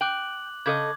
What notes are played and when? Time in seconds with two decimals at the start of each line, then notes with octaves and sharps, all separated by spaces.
0.01 G5 D6 F#6 F#7
0.66 C#3 A4 D#5 D6 G#6